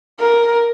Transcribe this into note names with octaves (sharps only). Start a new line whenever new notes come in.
A#4